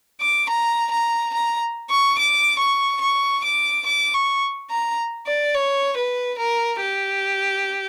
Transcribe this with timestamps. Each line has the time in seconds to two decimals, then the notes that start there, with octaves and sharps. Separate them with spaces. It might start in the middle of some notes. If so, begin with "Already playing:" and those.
0.21 D6
0.50 A#5
0.91 A#5
1.34 A#5
1.90 C#6
2.18 D6
2.59 C#6
3.01 C#6
3.44 D6
3.86 D6
4.14 C#6
4.70 A#5
5.26 D5
5.54 C#5
5.97 B4
6.39 A#4
6.81 G4